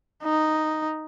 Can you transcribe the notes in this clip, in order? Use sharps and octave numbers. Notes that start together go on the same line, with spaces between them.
D#4